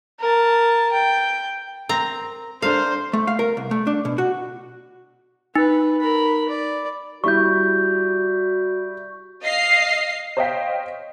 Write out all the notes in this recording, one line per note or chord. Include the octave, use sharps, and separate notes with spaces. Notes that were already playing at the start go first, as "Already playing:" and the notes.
A#4 A5
G5
C4 A#4 A#5
D4 A4 A#4 C5 F5
A3
F5
A#4
C2
A3
D4
B2
F#4
D#4 B4
A#4 B5
D5
G3 E4 F#4 C#6 G6
D#5 F5 C7
C5 C#5 D#5 F5 G5 B6